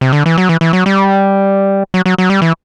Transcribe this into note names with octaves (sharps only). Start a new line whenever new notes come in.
C3
D3
E3
F#3
E3
E3
F#3
G3
F#3
F#3
F#3
G3
E3